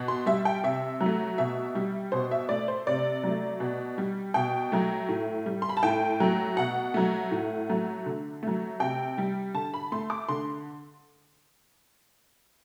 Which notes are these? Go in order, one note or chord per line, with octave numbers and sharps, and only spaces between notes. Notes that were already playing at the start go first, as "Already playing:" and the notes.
Already playing: B2
C6
G3 E5
G5
C3 E5
F#3
A3
B2 E5
G3
B2 C5
E5
A3 D5
C5
C3 D5
F#3 A3
B2
G3
B2 G5
F#3 A3
A2
G3
C6
B5
A5
A2 G5
F#3 A3
B2 F#5
F#3 A3
A2
F#3 A3
D3
F#3 A3
C3 G5
G3
D3 A5
B5
A3 C6
D6
D3 C6